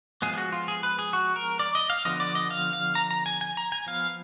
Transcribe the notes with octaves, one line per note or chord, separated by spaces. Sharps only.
F3 G#3 B3 G#4
G#4
F#4
F4
G#4
B4
G#4
F#4
A#4
D5
D#5
F5
D3 F3 B3 D#5
D5
D#5
F5
F5
A#5
A#5
G#5
G#5
A#5
G#5
F3 B3 F5